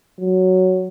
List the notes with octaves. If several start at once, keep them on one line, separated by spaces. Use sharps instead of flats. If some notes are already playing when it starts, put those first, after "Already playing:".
F#3